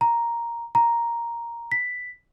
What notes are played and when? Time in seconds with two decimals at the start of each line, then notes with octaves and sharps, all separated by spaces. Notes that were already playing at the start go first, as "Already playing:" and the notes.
0.01 A#5
0.75 A#5
1.72 B6